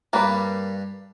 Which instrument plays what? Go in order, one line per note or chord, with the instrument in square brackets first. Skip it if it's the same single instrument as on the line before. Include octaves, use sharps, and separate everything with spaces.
[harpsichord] G2 G3 [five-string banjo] A#3 B4 D5